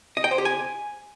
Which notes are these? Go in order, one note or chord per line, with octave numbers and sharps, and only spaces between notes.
D#5
G5
C5
G4
G#5